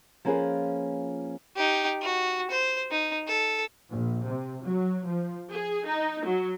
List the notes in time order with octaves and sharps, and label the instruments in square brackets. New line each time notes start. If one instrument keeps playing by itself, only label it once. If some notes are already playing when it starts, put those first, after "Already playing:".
[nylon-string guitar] F3 A#3 C#4 F4 G#4 B4
[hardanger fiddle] D#4 G4
F#4
C5
D#4
A4
[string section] A#1
C3
F#3
F3
G#4
D#4
F#3